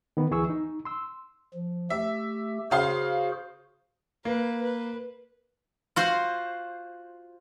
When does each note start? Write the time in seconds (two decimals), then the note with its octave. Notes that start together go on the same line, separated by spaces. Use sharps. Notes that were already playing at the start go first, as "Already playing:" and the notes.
0.17 D#3 B3
0.31 D2 E3 G#4 C#6 E6
0.50 D#4
0.85 C6 E6
1.54 F3
1.90 A3 G4 E5
2.71 C#3 F#4 G#4 C5 F5 C6
4.25 A#3 B4
4.62 B4
5.96 F4 F#4 C5